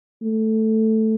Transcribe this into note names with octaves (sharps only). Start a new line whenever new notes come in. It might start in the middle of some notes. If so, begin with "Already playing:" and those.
A3